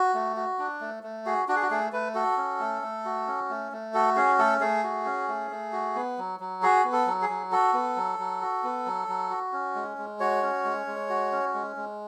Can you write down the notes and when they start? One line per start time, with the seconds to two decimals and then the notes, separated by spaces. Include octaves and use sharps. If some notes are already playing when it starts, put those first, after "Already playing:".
Already playing: F#4
0.14 A3
0.37 F#4
0.59 D4
0.81 A3
1.03 A3
1.26 F#4 G#4
1.48 D4 F#4
1.55 G#4
1.62 F#4
1.71 A3 G#4
1.93 A3 B4
2.15 F#4 A4
2.37 C#4
2.59 A3
2.82 A3
3.05 F#4
3.27 C#4
3.50 A3
3.72 A3
3.94 F#4 A4
4.16 C#4 G#4
4.39 A3 A4
4.61 A3 G#4
4.84 F#4
5.06 C#4
5.28 A3
5.51 A3
5.73 F#4
5.95 B3
6.18 F#3
6.40 F#3
6.62 F#4 G#4
6.85 B3
6.92 A4
7.07 F#3
7.22 G#4
7.29 F#3
7.52 F#4 A4
7.73 B3
7.96 F#3
8.19 F#3
8.41 F#4
8.63 B3
8.86 F#3
9.08 F#3
9.30 F#4
9.52 C#4
9.75 G#3
9.98 G#3
10.20 F#4 C#5
10.42 C#4
10.65 G#3
10.86 G#3
11.09 F#4
11.32 C#4
11.54 G#3
11.76 G#3